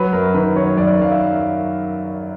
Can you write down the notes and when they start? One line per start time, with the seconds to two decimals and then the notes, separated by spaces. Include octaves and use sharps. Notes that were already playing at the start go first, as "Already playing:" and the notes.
Already playing: F#3 B4
0.13 F#2 A#4
0.34 D#3 B4
0.56 F#3 C#5
0.77 F#2 D5
0.99 F#2 F5
1.11 E5